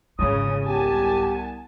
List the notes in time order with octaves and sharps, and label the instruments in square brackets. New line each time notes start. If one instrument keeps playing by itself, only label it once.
[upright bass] G#1 F4 [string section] C#3 [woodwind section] D#6
[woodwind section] C2 B3 [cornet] G4 [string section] G#5 A5